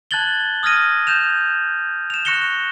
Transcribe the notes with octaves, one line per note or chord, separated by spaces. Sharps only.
A5 F#6 G#6 A6 F#7 G7
D#6 F6 G#6 A#6 D#7
G6 E7 F7
E7 F7
C#6 F#6 A#6 C#7 E7 G7